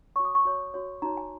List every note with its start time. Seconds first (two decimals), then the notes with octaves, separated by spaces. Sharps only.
0.16 F#4 C#5 C#6
0.25 D#6
0.35 C#6
0.45 F#4 C#5
0.74 F#4 C#5
1.02 D#4 F#4 C#5 A#5
1.17 G#5